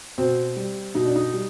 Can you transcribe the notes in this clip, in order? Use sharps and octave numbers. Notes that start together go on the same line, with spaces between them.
B2 C4
G3
B2 D#4
D4
D#4
G3